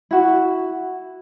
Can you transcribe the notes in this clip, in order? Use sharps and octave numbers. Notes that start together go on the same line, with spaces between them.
E4 F#4